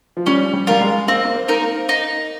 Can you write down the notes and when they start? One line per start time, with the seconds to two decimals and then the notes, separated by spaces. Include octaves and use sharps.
0.17 F3
0.26 G3 C#4
0.53 G3
0.67 G3 F4 A#4
0.81 G#3
1.08 A#3 C4
1.25 A#3
1.35 C4
1.48 D#4 A#4
1.62 A#3
1.89 D#4